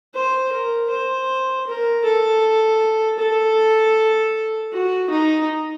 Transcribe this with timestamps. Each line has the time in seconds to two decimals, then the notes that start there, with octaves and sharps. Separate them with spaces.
0.14 C5
0.52 A#4
0.90 C5
1.67 A#4
2.05 A4
3.19 A4
4.72 F#4
5.10 D#4